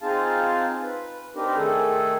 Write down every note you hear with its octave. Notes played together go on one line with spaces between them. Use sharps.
C4 D#4 F4 G#4 F5 A5
B4
C4 D4 D#4 G4 A#4 B4
D#3 A3 G#4 A4